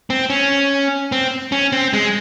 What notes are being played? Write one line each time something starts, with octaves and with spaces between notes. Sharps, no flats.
C4
C#4
C4
C#4
C4
G#3